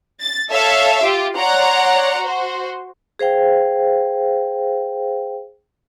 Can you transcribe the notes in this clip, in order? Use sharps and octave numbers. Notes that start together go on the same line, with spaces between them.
A6
A4 C#5 E5 F5
F4 G4
C#5 D5 F#5 A#5 C6
F#4 C5
G#4 C5 F5 G5